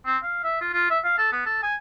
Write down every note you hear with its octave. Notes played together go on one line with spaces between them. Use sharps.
C4
F5
E5
F4
F4
E5
F5
A4
B3
A4
G#5